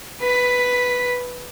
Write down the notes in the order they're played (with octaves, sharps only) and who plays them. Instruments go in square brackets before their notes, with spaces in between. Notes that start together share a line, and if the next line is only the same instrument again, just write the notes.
[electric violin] B4 B6